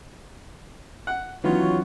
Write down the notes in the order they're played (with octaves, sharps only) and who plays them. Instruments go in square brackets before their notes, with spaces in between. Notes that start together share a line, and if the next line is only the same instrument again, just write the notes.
[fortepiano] F#5
[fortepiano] D#3 B3 [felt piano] E3 F#3 C#4 [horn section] F4 F#4 C#5